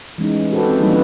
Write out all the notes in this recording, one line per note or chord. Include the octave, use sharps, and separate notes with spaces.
E3 G#3 C#4 D#4
A3 C#4
F#4 G4 A4 B4 C5
C4
D3 E3 F#3 G3 A#3 D#4
E3 C#4 D#4 B4